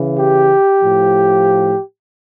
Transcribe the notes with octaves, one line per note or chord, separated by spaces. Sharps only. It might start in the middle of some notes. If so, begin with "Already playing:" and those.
Already playing: C#3 E3
G4
A2 F3